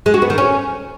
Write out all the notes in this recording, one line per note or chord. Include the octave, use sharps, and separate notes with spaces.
G#3
F#4
B3
D#3
C#4